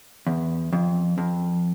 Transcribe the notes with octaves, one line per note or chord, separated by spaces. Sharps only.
E2
F2
F2